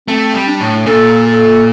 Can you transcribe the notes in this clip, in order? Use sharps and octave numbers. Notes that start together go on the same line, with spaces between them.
A3 C4
G3
D4
A2
A#2 A4
A4